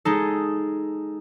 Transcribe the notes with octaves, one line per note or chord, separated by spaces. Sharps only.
G#3 D#4 A4